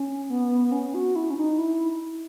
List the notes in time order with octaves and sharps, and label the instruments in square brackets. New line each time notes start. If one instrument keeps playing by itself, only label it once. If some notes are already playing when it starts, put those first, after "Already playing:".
Already playing: [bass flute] C#4
B3
C#4
F#4
E4
C#4
D#4
E4